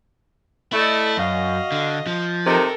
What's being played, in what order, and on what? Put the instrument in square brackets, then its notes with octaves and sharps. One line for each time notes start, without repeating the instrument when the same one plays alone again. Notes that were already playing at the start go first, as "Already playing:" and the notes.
[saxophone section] A3 [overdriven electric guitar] E4 [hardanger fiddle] D5 D#5
[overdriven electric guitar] F#2 [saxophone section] F#4 F5 [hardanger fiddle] D#5
[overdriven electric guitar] D3
F3
[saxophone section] C3 D#3 [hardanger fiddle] A4 A#4